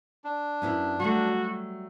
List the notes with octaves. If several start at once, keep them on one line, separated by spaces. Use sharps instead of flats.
D4
F#2 B3 E4
F#3 G3 A3 F#4